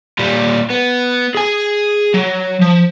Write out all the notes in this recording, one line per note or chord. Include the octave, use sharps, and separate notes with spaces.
A#2 G3
B3
G#4 G#5
F#3
F3